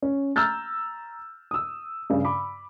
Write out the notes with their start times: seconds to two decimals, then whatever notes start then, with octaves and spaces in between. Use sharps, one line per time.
0.02 C#4
0.36 A#5 E6 F6 G6 A6
1.51 D#6 E6
2.10 G2 C#3
2.25 B5 D6